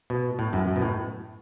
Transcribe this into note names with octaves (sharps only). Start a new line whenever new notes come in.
B2
A2
F#2
F#2
B2
A2